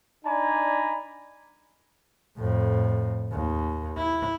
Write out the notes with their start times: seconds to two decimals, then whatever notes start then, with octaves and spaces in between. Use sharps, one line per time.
0.24 D4 D#4 D5 G#5 A#5 B5
2.37 F2 A2
3.32 D#2
3.97 E4